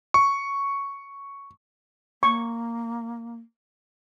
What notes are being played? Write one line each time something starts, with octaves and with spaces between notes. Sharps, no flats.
C#6
A#3 C#6